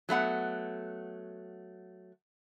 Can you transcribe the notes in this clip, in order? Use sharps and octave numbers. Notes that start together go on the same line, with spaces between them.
F#3 A3 B3 F#5